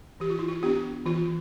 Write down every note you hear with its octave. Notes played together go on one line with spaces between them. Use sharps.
E3 G4
F4
E4
F4
B3 D4 G4
E3 F4